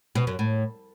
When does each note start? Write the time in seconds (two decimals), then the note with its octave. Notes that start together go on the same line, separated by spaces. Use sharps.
0.15 B2
0.27 F#2
0.39 A2